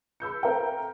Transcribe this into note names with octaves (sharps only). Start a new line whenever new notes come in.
B5 E6 G6 C#7
C4 A4 A#4 E5 F5 G5